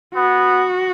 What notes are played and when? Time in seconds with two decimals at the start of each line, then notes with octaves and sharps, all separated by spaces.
0.15 B3 F#4